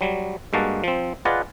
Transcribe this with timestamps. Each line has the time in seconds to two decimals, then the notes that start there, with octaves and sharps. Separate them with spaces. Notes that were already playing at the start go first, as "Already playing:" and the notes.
0.01 F#3 G3
0.53 G2 G#3 A#3 F#4 A5
0.84 F3 C4
1.25 F4 G#4 B4 D5 D#5 F#5